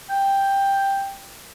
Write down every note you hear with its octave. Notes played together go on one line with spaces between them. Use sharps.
G5